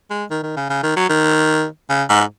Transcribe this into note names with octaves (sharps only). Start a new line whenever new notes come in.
G#3
D#3
D#3
C#3
C#3
D#3
F#3
D#3
C#3
G#2